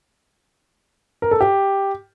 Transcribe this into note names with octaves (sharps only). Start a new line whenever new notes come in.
A#4
A4
G4